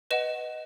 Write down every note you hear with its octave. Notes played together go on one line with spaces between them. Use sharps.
B4 D#5 F#5 E7